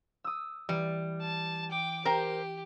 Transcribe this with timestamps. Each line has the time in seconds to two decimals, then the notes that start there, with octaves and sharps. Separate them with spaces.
0.24 D#6 E6
0.69 E3 G3
1.21 A5
1.71 G5 D6
2.05 G4 A#4 C5 G5